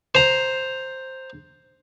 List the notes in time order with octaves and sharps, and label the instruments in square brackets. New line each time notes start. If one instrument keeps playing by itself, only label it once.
[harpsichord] C5 A#5